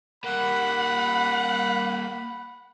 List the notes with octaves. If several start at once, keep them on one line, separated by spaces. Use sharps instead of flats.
G3 A#3 F#5 B5